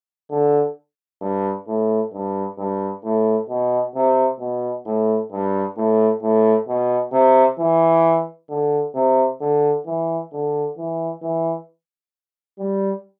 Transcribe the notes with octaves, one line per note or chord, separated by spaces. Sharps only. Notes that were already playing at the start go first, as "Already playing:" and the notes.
D3
G2
A2
G2
G2
A2
B2
C3
B2
A2
G2
A2
A2
B2
C3
E3
D3
C3
D3
E3
D3
E3
E3
G3